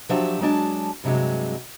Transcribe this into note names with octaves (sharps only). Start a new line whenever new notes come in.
F3 F#3 D4 F#4 G4 E5
F#3 G#3 D4 A5
G2 C3 F3 F#3 G#3